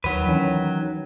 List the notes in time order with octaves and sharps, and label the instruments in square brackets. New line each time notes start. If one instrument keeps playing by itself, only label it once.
[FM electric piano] D#2 [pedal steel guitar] D#3 F#3 B4
[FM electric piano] E3 C#4